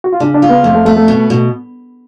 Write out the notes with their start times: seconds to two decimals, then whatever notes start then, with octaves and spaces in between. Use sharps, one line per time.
0.04 F#4
0.13 F4
0.20 C#3 D4
0.34 D4
0.42 F4
0.49 B3
0.64 F2 A3
0.75 A3
0.85 A3 B3
0.97 A3
1.08 B2
1.30 B2